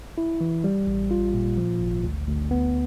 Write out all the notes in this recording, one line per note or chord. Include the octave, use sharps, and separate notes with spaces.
E4
E3
G3
A1
F4
A#2
F3
G#1
D2
D2
B3